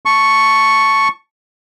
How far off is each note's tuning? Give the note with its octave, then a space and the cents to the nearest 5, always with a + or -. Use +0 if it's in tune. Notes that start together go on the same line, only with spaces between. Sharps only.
A5 +0 C#6 +0